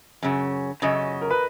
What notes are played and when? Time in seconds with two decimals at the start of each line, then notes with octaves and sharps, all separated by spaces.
0.22 F#2 C#3
0.82 F#2 C#3 D#5
1.21 A#4
1.31 B4